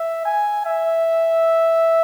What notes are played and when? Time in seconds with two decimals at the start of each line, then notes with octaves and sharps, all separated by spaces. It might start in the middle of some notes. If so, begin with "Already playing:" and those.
Already playing: E5
0.25 G#5
0.66 E5